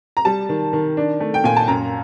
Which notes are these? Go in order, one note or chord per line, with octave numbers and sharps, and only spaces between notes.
A#5
G3 A5
D#3
D#3
D4
A3
G5
A#2 G#5
A5
F#2 A#5